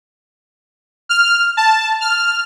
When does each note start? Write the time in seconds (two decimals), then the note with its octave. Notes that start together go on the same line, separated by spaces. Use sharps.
1.09 F6
1.57 A5
2.01 F6